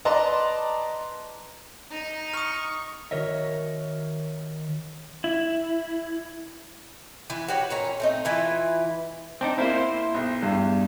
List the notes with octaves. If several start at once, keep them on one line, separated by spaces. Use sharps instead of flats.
B4 D5 D#5 A5 A#5 C6
D#4
C#6 D#6 F6
D#3 F#4 A#4 C#5 D#5 E5
E4
E3 B4
F#4 G4 B4 C#5
A#2 C#4 A#5
A3 C4 D#4
E3 E4 F4 B4
C4 D4 D#4
A#3 C4 E4 C5
C6
B1
E2 G2